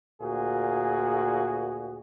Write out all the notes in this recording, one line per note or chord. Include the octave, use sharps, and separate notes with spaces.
D2 A#2 F#4 G#4